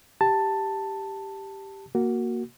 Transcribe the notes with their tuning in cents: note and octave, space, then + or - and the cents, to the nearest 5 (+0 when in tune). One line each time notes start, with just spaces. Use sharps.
G4 +0 A5 +10
A#3 +0 F#4 +0